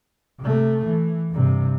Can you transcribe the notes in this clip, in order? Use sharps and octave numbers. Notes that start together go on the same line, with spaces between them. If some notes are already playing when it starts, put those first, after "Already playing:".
C3 A3
E3
G2 C3